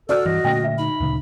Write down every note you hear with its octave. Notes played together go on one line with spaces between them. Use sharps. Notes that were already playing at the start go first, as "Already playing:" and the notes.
F#4 A4 D5 F6
G2 E3 D#5
A#2 D3 A3 G5 A#6
E5
D#4 B5
D2 A#2 C#3